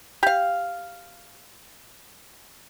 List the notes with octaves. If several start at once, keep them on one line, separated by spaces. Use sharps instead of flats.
G4 F5